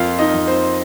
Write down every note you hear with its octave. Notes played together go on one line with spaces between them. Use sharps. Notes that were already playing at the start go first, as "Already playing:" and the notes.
Already playing: F2 A#3 F4 F5
D#4 D#5
F2
C4 C5